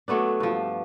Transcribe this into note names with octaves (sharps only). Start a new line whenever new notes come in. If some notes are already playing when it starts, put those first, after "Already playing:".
F#3 A3 B3 D4
G2 F3